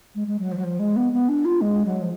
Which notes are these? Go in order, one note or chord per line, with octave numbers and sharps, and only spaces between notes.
G#3
G#3
F#3
F3
F#3
F3
G#3
B3
B3
D4
F4
G#3
F#3
F3